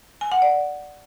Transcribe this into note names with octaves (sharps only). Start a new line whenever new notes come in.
G#5
F#5
D5